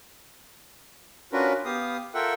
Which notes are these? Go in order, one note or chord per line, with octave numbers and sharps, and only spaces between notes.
C#4 D4 F4 F#4 A#4 B4
B3 G4 F5 D#6
F4 A4 A#4 E5 F#5 G5